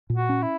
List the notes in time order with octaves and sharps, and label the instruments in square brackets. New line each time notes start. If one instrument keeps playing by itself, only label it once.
[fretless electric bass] A#2
[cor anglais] F#4
[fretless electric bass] C#4
[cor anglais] E4